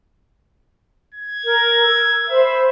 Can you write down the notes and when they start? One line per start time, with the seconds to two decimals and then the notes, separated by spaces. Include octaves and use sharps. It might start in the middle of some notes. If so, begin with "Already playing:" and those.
1.14 G#6
1.45 A#4
1.84 E6
2.29 C5 E5 B5